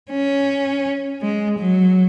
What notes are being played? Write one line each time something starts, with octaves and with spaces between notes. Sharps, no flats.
C#4
G#3
F#3